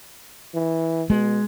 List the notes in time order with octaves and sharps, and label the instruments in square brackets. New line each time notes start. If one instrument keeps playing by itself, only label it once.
[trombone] E3
[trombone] B2 [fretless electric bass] G#3